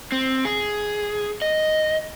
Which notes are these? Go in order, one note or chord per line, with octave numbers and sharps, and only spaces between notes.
C4
G#4
D#5